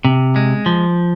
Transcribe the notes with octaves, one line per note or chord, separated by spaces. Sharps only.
C3
G#3
F3